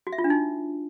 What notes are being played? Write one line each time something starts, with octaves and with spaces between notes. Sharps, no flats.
F#4
E5
F4
D4
D#4